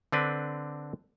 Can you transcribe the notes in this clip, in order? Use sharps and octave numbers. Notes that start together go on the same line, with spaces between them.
D3 C4 D4 B4